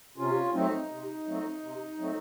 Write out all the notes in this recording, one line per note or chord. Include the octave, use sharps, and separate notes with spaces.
C3 C#4 F4
F#3 A3 C4 D#4
C3
F#3 A3 C4
C3
F#3 A3 C4